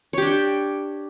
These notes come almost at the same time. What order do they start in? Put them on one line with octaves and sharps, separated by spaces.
C#5 G4 D4 G5